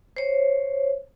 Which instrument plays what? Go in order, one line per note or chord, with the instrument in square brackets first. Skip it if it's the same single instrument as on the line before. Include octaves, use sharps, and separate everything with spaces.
[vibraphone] C5 C#5